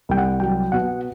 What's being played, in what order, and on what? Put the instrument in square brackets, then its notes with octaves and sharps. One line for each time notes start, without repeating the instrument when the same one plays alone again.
[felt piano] C2 [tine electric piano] G5
[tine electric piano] F#5
[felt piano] F#3 [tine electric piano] G5
[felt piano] B2 [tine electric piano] F#5